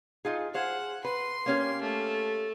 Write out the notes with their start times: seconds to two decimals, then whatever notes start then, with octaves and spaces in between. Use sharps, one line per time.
0.25 D#4 F4 G#4
0.54 G#4 C5 F5 F#5
1.05 B4 C6
1.46 A#3 C#4 G4
1.82 A3